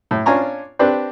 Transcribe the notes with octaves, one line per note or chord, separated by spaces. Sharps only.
A2
C#4 D4 F4 G#5 A#5 C#6
C4 D4 G4 B4 D5